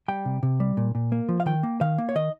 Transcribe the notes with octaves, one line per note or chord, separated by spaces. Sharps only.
G3 G5
C3
C3
G3
A#2
A#2
A#3
F3
F5
D#3 G5
A#3
D#3 F5
A#3
C#5
D#3 D#5